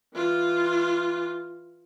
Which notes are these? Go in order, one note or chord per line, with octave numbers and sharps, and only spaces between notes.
E3 F4